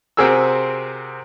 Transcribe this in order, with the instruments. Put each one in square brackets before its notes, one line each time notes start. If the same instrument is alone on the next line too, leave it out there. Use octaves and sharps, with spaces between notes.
[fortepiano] C3 C4 F#4 G#4 A#4 E6